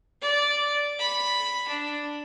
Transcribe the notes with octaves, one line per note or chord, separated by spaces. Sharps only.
D5
B5
D4